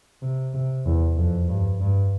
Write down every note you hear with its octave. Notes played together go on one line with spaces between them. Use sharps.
C3
C3
E2
F2
G2
G2